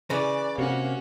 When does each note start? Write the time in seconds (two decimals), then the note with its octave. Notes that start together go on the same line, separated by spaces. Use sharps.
0.10 C#3 E3 D5
0.58 C3 A#3 C#4 F#4